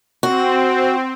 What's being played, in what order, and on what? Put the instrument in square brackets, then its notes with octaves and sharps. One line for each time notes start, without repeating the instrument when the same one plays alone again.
[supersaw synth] C4 [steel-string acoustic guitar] F#4